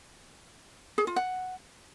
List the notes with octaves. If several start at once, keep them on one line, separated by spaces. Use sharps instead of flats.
G#4
F4
F#5